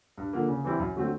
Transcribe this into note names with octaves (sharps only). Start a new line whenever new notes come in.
G2
D3 F3 A#3
C#3
E3 G3 C4 E4
F#2
D3 F#3 A3 C4